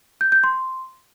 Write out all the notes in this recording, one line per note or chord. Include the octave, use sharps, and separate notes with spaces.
G6
G6
C6